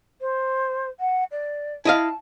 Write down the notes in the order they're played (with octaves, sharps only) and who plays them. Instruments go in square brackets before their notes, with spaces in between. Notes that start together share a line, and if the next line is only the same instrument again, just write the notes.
[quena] C5
F#5
D5
[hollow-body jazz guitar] E4 D#5 F5 [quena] A5